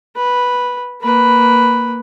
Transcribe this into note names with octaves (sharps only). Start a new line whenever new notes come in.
B4
A#3 B4